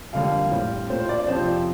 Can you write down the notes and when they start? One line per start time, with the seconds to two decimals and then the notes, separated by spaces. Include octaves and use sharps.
0.13 F2 D3 G3 A#3 F5
0.51 A2 G3 C4
0.90 A#2 A3 C4 C5
1.09 D5
1.28 F2 C3 F3 C5